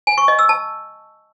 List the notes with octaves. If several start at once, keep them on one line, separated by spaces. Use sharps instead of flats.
G#5
C#6
D#5
E6
A5